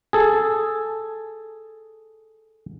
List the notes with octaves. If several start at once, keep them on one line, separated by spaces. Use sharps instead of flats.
G#4 A4